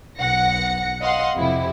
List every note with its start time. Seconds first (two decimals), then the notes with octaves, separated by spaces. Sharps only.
0.18 B1 F#5 A#6 C#7
1.02 D#5 F5 F#5 C6
1.36 F2 C3 E4